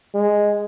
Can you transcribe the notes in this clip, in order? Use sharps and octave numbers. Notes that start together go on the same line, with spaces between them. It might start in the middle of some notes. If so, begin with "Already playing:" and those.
G#3